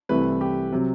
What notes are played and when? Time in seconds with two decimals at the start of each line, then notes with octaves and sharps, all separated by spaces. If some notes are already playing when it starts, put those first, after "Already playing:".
0.09 C2 C3 E3 A3 B4
0.41 G4
0.72 C3 F#3